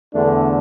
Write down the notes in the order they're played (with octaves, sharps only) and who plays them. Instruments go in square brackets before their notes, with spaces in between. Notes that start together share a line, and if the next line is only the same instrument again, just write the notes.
[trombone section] E2 D3 A3 D4